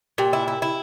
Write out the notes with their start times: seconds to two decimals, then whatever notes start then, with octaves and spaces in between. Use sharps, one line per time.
0.18 A#2 G4 G5
0.33 E4
0.48 E4
0.62 E4